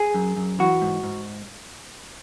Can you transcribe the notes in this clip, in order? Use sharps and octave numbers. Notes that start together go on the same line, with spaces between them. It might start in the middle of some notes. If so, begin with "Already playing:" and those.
Already playing: G#4
F#2
F#2
E3 F#4
G#2
G#2